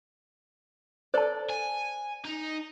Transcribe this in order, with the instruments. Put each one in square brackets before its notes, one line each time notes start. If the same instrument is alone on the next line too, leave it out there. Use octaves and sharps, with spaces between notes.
[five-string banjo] A4 D5 [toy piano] C5 A5
[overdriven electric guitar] G#5
D#4